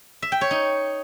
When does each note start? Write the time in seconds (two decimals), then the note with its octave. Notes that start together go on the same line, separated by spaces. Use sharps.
0.22 E5
0.32 G5
0.41 C#5
0.51 D#4